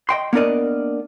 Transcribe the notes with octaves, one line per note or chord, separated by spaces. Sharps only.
D#5 G5 C6
A#3 B3 D4 A#4 D5 D#5